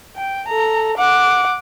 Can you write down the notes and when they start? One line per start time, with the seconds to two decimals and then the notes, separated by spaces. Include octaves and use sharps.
0.16 G5
0.48 A4 A#5
0.98 F#5 D6